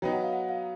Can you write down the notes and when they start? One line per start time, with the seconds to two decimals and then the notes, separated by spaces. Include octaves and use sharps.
0.02 F#3 B3 D#4 G5
0.12 F#5
0.23 F5
0.33 F#5
0.49 F5